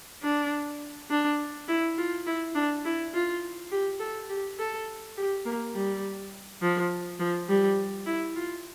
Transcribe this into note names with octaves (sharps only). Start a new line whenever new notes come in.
D4
D4
E4
F4
E4
D4
E4
F4
G4
A4
G4
A4
G4
A#3
G3
F3
F3
G3
E4
F4